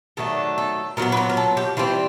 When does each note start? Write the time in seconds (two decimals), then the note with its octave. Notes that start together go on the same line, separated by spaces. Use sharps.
0.17 D#3 F#3 A3 D4 A4
0.58 A4
0.97 A#2 F#3 B3 A#4
1.12 B4
1.17 A#4
1.30 A#4
1.37 A4
1.57 G4
1.77 E3 G3 C4 F4